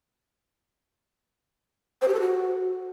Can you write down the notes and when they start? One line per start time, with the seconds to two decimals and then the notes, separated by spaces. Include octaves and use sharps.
2.02 C5
2.08 G4
2.14 A4
2.20 F#4